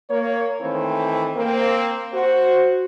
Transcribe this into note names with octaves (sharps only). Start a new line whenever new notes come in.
A#3 C#5
D#3 E3 A3 C4
A#3 C4
F#4 C5